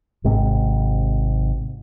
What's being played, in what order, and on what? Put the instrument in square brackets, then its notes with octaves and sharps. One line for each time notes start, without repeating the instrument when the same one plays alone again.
[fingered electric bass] G#1 G#2 C3